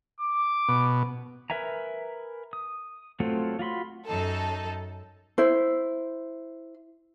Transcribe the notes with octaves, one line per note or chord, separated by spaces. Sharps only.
D6
B2
A#4 B4 E5 G#5 A#5
D#6
F#3 A3 C4 F4
F4 F#4 B5 C6
F#2 D#4 A4
E4 C5